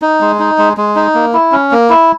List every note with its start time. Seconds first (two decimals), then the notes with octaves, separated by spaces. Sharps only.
0.02 D#4
0.21 G#3
0.39 D#4
0.58 G#3
0.77 G#3
0.96 D#4
1.14 A#3
1.34 E4
1.52 C#4
1.71 A#3
1.90 E4